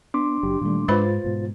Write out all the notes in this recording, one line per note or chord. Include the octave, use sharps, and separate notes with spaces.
B3 D4 C6 D6
F#1 F#3 G4
A#2 D#3 G3 A3
G#2 G#3 F4 B4 C5 B5 A6
G#2 B2